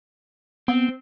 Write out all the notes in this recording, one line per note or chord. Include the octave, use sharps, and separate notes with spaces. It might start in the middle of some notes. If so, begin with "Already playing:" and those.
B3 C4